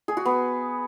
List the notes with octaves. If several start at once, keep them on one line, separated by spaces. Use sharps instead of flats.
G#4
F#4
B3